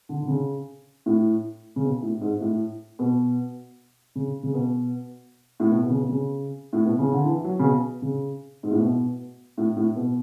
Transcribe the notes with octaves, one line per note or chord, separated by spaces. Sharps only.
D3
D3
C#3
A2
C#3
B2
A2
G#2
A2
B2
C#3
C#3
B2
A2
B2
B2
C#3
B2
C#3
A2
B2
C#3
D3
E3
F#3
C#3
B2
C#3
G#2
A2
B2
A2
A2
B2